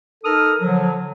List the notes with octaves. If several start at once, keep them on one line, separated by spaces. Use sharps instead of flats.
D#4 A4 A#4 D#6 F6
D3 F3 F#3